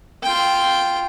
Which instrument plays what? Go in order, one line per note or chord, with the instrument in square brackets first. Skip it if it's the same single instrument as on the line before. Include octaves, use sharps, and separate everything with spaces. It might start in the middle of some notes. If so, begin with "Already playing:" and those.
[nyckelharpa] F4 G5